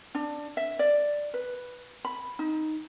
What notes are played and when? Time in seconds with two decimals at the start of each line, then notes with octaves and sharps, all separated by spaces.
0.15 D4
0.57 E5
0.79 D5
1.34 B4
2.05 B5
2.39 D#4